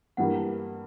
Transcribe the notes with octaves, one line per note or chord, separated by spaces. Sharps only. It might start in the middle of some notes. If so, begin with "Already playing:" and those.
G2 E3 G3 A#3 F#5